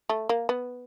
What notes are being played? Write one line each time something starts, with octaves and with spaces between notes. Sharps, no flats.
A3
A#3
B3